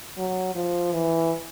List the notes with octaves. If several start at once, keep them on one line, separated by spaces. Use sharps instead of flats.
F#3
F3
E3